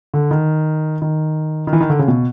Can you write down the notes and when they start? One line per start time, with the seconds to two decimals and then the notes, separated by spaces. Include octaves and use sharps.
0.14 D3
0.31 D#3
1.02 D#3
1.67 D#3
1.73 E3
1.81 D#3
1.90 D3
1.99 C#3
2.08 B2